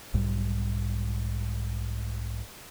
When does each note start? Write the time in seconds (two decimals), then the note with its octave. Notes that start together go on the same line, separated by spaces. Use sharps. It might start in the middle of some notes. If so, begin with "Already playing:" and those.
0.14 B1 G#2 G3